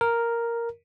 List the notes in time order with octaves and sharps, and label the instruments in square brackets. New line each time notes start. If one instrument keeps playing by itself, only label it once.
[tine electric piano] A#4